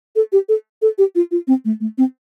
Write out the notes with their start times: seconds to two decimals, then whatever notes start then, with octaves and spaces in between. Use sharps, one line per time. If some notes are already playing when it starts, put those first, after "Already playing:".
0.16 A4
0.32 G4
0.49 A4
0.82 A4
0.98 G4
1.15 F4
1.31 F4
1.47 C4
1.65 A3
1.80 A3
1.98 C4